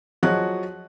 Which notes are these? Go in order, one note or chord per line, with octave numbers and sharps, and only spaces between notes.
F3 F#3 F#4 G#4 D#5 F#6